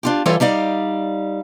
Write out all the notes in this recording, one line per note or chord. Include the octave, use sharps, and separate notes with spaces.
D4 F4 G4
E3 G3 E4 F4 A4 C#5
G3 D#4 D5 F5